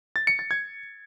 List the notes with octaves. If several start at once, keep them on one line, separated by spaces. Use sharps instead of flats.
A6
C#7
A6
G#6